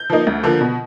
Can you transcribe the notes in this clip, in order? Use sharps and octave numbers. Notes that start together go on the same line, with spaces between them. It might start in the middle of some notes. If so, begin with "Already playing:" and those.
Already playing: G6
F3 A#3 D#4
D2
D3 F3 A#3
B2